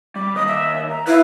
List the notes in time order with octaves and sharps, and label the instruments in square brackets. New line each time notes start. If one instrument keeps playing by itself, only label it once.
[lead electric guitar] G3 [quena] D6
[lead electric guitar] D#2 D#5 [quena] D#6
[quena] E5
A#5
[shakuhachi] E4 [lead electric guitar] B4 [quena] F5